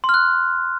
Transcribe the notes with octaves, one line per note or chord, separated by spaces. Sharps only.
C6
F6
F#6